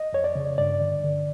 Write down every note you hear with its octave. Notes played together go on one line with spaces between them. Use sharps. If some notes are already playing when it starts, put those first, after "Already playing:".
Already playing: D#5
F2 C#5
D5
C#3
G2 D5
D3
D3